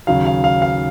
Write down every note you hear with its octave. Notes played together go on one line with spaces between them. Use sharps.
D#2 C#3 F#3 F5
F5
F5
F5